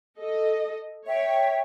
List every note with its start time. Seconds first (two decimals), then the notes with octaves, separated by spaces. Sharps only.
0.19 A4 D#5
1.08 C#5 E5 G5